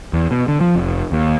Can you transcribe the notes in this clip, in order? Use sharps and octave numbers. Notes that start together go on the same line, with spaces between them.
E2
B2
D3
F3
F1
D#2